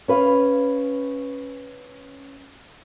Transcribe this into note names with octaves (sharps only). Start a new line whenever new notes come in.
C#4 B4 F5